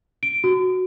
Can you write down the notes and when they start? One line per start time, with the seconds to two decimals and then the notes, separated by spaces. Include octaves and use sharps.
0.23 D7
0.44 F#4